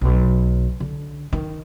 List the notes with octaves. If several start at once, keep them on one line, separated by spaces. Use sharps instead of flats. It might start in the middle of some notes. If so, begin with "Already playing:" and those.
B1
D3
D#3